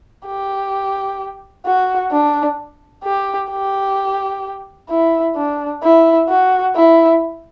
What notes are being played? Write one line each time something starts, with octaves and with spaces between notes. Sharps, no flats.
G4
F#4
D4
G4
G4
E4
D4
E4
F#4
E4